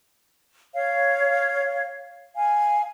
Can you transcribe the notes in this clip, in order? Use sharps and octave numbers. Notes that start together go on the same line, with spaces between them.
C#5 F5
F5 G#5